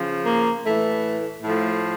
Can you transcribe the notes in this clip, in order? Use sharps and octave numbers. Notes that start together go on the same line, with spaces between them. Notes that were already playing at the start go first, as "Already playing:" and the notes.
Already playing: C#3 F3
A#3
A2 E3 A3
A2 F3 A3